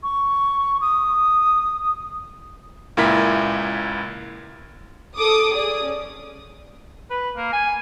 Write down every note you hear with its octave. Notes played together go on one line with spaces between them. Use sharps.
C#6
D#6
C#2 A#2 E4 A#4 B6
A4 D6 D#6
G#4 D5 D#6
C#4
B4
A#3
G#5